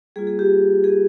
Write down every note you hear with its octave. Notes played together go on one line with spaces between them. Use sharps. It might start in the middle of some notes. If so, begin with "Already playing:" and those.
G3 A#3 F4 G#4
G#4
G4
G#4